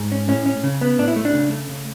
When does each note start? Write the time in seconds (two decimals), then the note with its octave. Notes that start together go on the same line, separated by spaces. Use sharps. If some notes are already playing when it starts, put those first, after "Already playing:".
Already playing: G#2
0.12 C#4
0.28 A2 C#4
0.46 C#4
0.63 C#3
0.81 B3
0.98 A2 D4
1.08 E4
1.16 A3
1.25 D4
1.34 C#3
1.51 A3
1.69 C#3